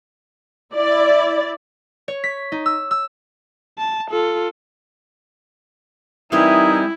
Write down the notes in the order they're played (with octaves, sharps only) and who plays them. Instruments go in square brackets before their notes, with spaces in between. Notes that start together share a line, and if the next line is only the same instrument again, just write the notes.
[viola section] E4 D5
[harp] C#5
B6
D#4
E6
E6
[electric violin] A5
F4 A4
[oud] E3 G3 C4 [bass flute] D#4 [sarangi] E4 [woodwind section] A#4 G#5 D#6